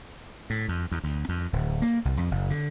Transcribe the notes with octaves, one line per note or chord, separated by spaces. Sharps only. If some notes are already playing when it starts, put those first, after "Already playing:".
A2
F2
E2
D2
F2
D1
A#3
C2
F2
F#1
D3